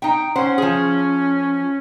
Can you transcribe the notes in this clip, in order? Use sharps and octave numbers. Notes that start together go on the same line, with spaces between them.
D#4 G5
C#4 C5 F#5
F3 G#4